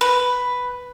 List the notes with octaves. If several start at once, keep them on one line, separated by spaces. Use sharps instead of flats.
B4